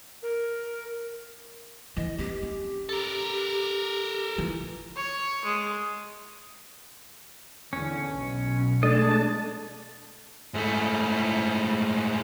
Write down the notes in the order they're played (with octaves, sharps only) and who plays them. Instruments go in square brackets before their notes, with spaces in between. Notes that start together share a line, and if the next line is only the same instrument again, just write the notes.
[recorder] A#4
[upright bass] E3 [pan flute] D#5
[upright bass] C4 [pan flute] G4
[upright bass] C#4
[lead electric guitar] A4 A#4
[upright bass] E3 [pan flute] F4
[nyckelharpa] C#5
G#3
[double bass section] E2 D3 [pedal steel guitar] C#4
[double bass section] B1 B2
[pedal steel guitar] G#3 D#5 [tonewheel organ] A3 D4 A5
[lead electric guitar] G#2 A3